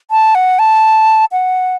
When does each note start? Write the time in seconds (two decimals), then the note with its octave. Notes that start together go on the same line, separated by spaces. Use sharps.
0.11 A5
0.35 F#5
0.59 A5
1.32 F#5